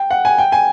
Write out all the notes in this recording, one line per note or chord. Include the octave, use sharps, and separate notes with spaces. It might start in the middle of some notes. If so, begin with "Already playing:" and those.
Already playing: G5
F#5
G#5
G5
G#5